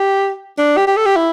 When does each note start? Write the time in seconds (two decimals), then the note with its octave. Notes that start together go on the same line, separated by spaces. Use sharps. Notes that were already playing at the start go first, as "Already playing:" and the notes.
Already playing: G4
0.58 D4
0.77 G4
0.87 G4
0.97 A4
1.06 G4
1.16 E4